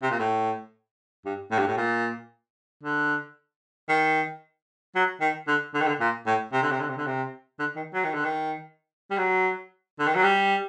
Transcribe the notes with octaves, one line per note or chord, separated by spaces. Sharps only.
C3
A#2
A2
G2
A2
G2
A2
A#2
D3
D#3
F#3
D#3
D3
D3
D#3
D3
A#2
A2
C3
D3
C3
D3
C3
D3
C3
D3
D#3
F#3
D#3
D3
D#3
G3
F#3
D3
D#3
F#3
G3